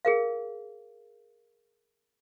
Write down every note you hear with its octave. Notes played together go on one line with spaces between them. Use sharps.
G#4 A#4 F5